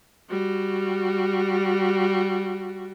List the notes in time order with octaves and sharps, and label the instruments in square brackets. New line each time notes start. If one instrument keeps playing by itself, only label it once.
[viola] G3 F#4